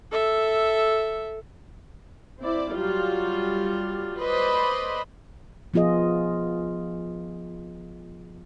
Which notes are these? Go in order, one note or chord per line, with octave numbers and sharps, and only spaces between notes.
A4 E5
C4 E4 D5
F#3 G3 F4
B4 C5 D5 D#5 B5 C6
F3 B3 F4 G#4 D#5